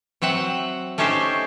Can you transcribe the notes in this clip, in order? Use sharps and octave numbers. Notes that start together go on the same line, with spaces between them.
F#3 C4 E5 F#5
A3 C#4 D#4 G4 C5 E5